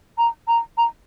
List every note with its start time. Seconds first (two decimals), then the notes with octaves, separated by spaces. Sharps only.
0.18 A#5
0.48 A#5
0.78 A#5